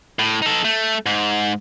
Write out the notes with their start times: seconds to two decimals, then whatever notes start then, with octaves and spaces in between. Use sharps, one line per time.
0.19 A2
0.42 D#4 A4
0.64 A3
1.06 G#2